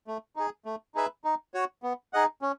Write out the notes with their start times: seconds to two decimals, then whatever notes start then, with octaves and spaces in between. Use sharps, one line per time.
0.07 A3
0.36 D#4 G#4
0.65 A3
0.95 D#4 G#4 B4 E5
1.24 D#4
1.54 F#4 C#5
1.83 B3
2.13 D#4 G#4 D#5 F#5
2.42 C#4